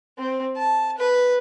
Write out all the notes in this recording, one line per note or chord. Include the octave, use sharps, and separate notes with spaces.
C4
A5
B4